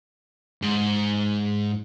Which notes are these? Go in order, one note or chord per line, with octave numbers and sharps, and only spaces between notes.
G#2